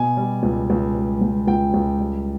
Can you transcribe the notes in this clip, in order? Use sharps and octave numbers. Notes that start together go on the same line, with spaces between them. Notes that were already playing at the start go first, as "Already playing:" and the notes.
Already playing: B2 G#5
G3
C#2
C#2
G3
C#2
C#2 G5
C#2
G3